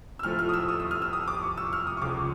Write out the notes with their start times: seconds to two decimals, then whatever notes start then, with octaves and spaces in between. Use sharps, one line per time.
0.19 E6
0.23 A2 F3 A3 F6
0.39 F6
0.49 D#6
0.54 E6
0.68 D#6
0.80 E6
0.91 F6
1.02 E6
1.13 D#6
1.28 D6
1.43 C#6
1.57 E6
1.73 F6
1.87 D#6
1.97 C#6
2.01 C#2 C#3 F3 G#3 D6